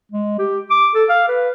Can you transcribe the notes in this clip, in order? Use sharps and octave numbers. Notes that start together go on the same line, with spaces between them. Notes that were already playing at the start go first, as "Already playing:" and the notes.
G#3
G4
D6
A4
F5
B4